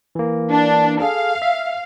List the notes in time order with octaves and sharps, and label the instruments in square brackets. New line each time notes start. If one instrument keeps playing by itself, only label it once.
[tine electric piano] E3 A#3
[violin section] D4
[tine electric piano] G#4 A4 [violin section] F5
[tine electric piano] E5